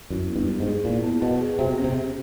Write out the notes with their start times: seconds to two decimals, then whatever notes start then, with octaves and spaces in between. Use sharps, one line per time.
0.10 F#2 E4
0.29 B3
0.36 G2
0.48 B3
0.60 G#2
0.67 G#4
0.85 A#2 E4
1.03 B3
1.22 B2 B3
1.41 G#4
1.59 C3 F#4
1.78 C#4
1.84 C3
1.96 C#4